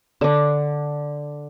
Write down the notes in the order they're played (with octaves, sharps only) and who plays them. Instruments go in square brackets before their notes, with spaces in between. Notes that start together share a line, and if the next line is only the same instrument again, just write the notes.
[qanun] D3 D4